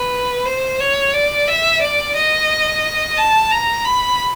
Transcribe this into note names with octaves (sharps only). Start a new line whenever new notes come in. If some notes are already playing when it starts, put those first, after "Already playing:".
Already playing: B4
C5
C#5
D5
E5
D5
D#5
A5
A#5
B5